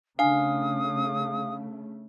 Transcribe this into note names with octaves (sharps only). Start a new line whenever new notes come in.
C#3 A3 D4 F5 G#5 D#6